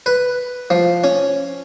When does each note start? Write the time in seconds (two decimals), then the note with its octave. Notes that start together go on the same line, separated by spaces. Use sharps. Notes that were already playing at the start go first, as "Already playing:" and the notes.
0.06 B4
0.70 F3
1.04 C#4